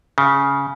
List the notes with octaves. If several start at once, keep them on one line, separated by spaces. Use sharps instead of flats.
C#3